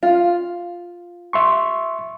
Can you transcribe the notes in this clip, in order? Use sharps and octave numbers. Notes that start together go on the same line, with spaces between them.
F4
E5 C6 C#6